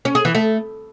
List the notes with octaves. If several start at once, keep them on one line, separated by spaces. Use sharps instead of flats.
C#4
G#4
E3
A3